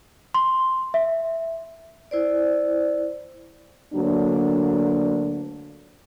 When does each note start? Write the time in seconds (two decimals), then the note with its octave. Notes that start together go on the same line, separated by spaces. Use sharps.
0.34 C6
0.94 E5
2.11 E4 C5 D5
3.94 D2 F#3 A#3 D4